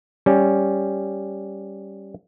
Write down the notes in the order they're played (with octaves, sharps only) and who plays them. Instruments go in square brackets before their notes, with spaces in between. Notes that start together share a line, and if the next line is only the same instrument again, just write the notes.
[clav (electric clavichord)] G3 C#4